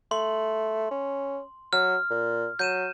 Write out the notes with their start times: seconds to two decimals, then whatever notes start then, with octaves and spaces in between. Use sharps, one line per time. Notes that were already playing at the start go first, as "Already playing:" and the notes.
0.11 A3 C6 F#7
0.91 C#4
1.73 F#3 F6
2.10 A#2
2.59 F#3 G6 D#7 E7